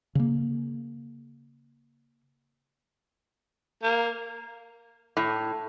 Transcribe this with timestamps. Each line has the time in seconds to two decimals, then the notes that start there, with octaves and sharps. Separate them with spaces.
0.15 C#3 A#3
3.83 A#3
5.17 A2